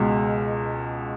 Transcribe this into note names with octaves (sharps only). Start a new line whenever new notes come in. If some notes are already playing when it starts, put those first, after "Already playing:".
Already playing: C#2 B2 G#3